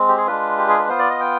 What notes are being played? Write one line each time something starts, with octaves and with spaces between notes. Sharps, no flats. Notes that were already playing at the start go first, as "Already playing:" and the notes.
Already playing: G#3 C4
G4
G#4
G#3 D4 F4 B4
G4
G#4
B4
B3 F4 C5
D5
D#5
G5